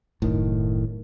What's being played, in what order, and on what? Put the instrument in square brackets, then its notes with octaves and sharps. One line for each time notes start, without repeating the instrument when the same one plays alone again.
[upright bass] F1 F#2 [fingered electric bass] A2 D#3